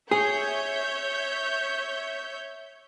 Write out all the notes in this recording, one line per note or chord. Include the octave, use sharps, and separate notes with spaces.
G#4 C#5 E5 G6